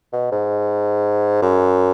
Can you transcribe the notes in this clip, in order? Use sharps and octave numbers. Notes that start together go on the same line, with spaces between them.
B2
G#2
F#2